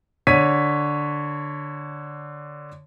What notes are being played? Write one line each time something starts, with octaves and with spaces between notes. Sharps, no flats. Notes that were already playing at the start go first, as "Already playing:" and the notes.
D3 C#5 B6 D#7